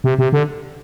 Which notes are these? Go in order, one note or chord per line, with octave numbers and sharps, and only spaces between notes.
C3
C3
D3